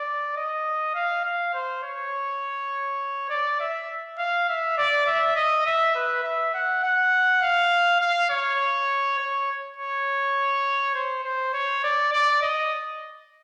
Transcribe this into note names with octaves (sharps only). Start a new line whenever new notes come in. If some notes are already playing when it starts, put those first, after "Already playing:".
Already playing: D5
D#5
F5
F5
C5
C#5
D5
E5
F5
E5
D5
E5
D#5
E5
B4
E5
F#5
F#5
F5
F5
C#5
C#5
C#5
C5
C5
C#5
D5
D5
D#5